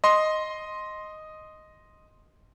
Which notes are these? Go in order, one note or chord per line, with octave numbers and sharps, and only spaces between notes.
D#5 C6